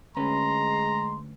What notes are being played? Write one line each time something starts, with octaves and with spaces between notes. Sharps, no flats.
D2 G#3 C#4 B4 A#5 C6